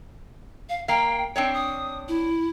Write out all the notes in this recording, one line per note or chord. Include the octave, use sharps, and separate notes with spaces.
F5
A#3 F5 G5
C4 D4 C#5 G5
D#6
E4